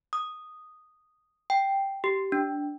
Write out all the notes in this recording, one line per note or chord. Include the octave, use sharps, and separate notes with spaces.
D#6
G5
G4
D4